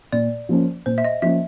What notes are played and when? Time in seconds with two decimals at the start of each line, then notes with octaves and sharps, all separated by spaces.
0.12 A#2 D5
0.49 F3 A#3 C#4
0.86 A#2 C5
0.98 E5
1.04 D#5
1.22 F3 A#3 C#4 E5